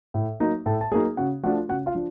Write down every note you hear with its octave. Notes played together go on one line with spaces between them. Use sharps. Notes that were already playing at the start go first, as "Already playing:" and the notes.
A2
F#3 A#3 D#4
A2 A4 A5
A5
F#3 A#3 D#4 G#4 G#5
C#3 F#4 F#5
F3 A3 D4 F4 F#4 F#5
C#3 F#4 F#5
F4 F5
F3 D4